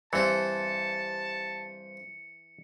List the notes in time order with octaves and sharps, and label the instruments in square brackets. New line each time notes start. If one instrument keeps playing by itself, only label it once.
[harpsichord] G2 C4 [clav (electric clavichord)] E3 [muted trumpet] A5 [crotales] C#7